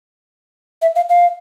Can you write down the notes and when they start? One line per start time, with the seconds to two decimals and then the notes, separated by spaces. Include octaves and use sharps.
0.82 E5
0.96 F5
1.09 F5